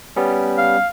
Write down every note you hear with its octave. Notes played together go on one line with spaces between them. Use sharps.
G3 B3 C#4
F5